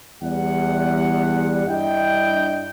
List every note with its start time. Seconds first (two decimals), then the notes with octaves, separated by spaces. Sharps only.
0.22 E2 G3 F#5
1.67 G2 D4 E4 D#5 G5